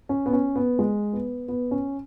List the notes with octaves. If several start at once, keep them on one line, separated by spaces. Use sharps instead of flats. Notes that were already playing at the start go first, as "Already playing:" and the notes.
C#4
B3
C#4
B3
G#3
B3
B3
C#4